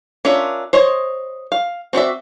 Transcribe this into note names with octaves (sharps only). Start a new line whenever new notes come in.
C#4 D4 F4 A#4 E5
C5 C#5 D#5
F5
C4 F#4 D5 E5